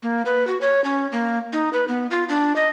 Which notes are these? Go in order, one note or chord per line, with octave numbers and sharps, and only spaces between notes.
A#3
B4
F#4
C#5
C#4
A#3
D#4
B4
B3
F4
D4
D#5